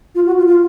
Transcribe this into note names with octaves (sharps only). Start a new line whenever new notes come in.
F4
F#4
F4
F4